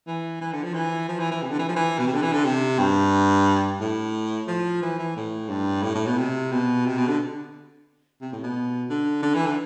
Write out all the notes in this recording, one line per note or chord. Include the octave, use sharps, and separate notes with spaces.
E3
E3
D3
F3
E3
F3
E3
E3
C3
D3
E3
F3
E3
B2
C3
D3
E3
D3
C3
G2
A2
F3
E3
E3
A2
G2
A2
A2
B2
C3
B2
C3
B2
D3
C3
A2
B2
D3
D3
E3
D3